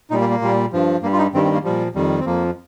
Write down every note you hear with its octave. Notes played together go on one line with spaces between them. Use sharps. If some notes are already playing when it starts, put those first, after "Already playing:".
A#2 G3 D#4
A#3
A#3
A#2 G3
G2 F3
G2 G3 A#3
F4
D#4
G2 D#3 G3 C4
C4
A#3
A#2 F3 G3
F2 D#3 G3
C4
F2 F3 A#3